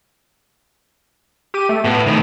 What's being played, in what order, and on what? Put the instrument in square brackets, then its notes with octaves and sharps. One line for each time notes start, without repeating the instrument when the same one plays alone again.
[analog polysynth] G4 D#7
A3
[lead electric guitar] A2 [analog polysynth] B3
[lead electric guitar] A2 D#3